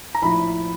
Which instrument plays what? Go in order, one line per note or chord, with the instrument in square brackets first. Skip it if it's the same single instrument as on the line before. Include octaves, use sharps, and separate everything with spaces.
[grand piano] A#5
A#1 A2 F3 B5